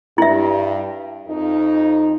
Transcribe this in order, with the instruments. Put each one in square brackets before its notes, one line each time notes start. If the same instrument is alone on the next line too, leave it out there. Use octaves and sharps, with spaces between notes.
[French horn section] G2 [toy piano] E4 E5
[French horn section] F2 D#4